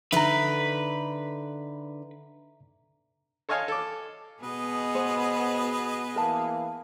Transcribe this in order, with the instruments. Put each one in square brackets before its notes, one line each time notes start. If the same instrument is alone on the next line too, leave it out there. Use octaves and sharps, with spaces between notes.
[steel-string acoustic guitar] D3 D#4 D5 [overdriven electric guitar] B4 [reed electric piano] E5 A#5
[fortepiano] A4 C#5 D#5 F5 G#5
A4 D6
[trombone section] B2 [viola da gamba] B3 G#4 [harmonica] B4 D#5
[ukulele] C5
[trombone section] E3 A#3 [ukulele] A#4 A5